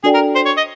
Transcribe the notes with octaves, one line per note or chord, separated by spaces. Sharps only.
D4 F#4 G#4 A4 D5 G5
A#4
C5
C#5
D#5